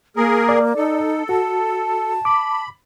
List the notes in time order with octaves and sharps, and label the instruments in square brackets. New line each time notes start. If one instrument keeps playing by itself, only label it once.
[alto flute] A#3 [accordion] G#4 A#4
[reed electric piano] D5
[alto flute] D#4 [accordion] A4
[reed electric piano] F#4 [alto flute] A5
[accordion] B5 [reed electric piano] D6